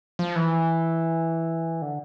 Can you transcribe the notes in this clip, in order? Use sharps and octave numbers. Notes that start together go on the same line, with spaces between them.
F3
E3
D3